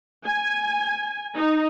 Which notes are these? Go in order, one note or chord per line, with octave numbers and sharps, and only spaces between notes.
G#5
D#4